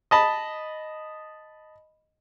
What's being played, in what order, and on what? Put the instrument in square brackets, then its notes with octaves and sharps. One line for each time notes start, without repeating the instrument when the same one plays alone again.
[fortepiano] D#5 A5 B5